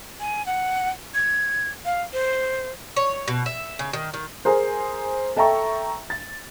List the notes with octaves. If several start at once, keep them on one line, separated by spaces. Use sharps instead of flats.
G#5
F#5
G#6
F5
C5
C#5
B2
E5
C#3
D#3
D#3
G#4 A#4 C5
A4 E5 G5 A#5 C#6
A6